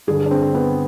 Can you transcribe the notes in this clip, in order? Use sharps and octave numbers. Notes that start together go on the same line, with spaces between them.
G2 D3 G#4
D4
C4
B3